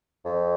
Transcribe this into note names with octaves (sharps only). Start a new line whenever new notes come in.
F2